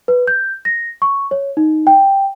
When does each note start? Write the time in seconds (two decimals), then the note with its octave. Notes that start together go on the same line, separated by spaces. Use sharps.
0.08 B4
0.27 G6
0.65 A#6
1.02 C#6
1.31 C#5
1.57 D#4
1.87 G5